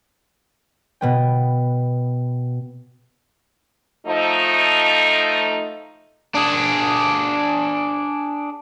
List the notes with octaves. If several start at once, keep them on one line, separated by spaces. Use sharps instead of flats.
B2 B3 G5
F3 A3 D#4
D4 G#4